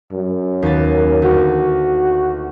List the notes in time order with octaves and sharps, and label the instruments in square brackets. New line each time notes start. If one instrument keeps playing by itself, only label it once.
[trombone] F#2
[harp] D#2 B3 A6
[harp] D2 [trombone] F#4